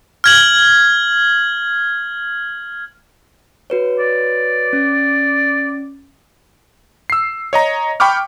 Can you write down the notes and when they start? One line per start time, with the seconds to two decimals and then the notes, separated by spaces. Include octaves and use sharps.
0.24 F6 G#6 F#7
3.70 F#4 B4 C#5
3.99 D5
4.73 C#4
7.10 E6 C7
7.53 C#5 D#5 A#5
8.00 G5 B5 C#6 D6 F6